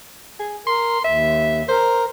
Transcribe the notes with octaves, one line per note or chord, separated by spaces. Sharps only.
G#4
A#4 C6
D#2 E5
A#4 C5